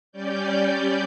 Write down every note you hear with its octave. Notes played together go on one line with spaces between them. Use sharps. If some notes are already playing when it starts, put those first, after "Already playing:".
G3 C#4 D5 G6